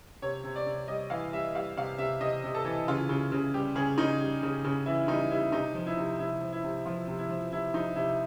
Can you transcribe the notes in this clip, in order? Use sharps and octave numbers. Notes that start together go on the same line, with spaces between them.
C3 C#5
C3
D5
C3
G3 D#5
E3 F5
G3 E5
G3 F5
C3 F5
C3 E5
C3 D#5
C3
A4
E3
C#3 F4
C#3
C#3
G3 G4
C#3 G#4
C#3 D#4
G3
C#3
C#3
E3 E4
G3 D#4
G3 E4
C3 D#4
F3
E4
C3
C3 E4
F3
E4
C3
F3 F4
C3
E4
F3
C3 E4
F3 D#4
C3 E4